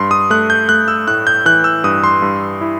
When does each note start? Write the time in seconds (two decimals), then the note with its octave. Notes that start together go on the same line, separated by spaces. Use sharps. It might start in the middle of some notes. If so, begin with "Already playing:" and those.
Already playing: G2 C6
0.11 D#6
0.30 A3 F#6
0.50 G6
0.69 A3 F#6
0.88 E6
1.07 A2 F#6
1.27 G6
1.45 E3 F#6
1.64 E6
1.84 G2 D#6
2.04 C6
2.22 G2
2.61 E4